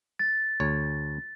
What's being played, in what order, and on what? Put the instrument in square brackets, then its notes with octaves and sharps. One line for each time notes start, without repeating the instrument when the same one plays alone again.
[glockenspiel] A6
[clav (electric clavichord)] D2 C#5